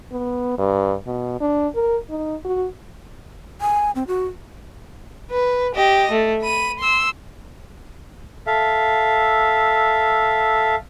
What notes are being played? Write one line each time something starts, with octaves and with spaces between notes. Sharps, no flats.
B3
G2
B2
D4
A#4
D#4
F#4
G#5
C4
F#4
B4
G4 D#5
A3
B5 D#7
C6 E6
A4 E5 F5